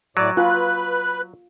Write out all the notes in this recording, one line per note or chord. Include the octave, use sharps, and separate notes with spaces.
A2 F#3 D5
F4 B4 F#6